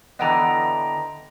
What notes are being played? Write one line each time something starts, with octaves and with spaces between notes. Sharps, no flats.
D3 E3 B3 D#5 G5 A#5